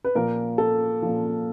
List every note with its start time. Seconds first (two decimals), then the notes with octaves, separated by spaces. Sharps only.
0.05 B4
0.15 A#2 F3 A#4
0.58 A4
1.02 A#2 F3